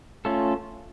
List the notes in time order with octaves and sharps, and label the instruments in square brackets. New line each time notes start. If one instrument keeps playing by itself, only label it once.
[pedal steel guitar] A3 C#4 F4 A4